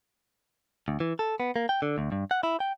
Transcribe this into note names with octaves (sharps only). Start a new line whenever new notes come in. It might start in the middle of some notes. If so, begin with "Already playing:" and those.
D2
E3
A4
B3
A#3
G5
D3
D2
G2
F#5
E4
G5